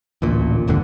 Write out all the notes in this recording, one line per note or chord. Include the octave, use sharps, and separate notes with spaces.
A1 D2 A#2
F1 D#2 G#2 D3